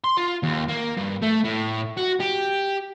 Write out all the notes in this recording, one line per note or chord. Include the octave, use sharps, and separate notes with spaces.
C6
F4
D#2
A#3
G2
A3
A2
F#4
G4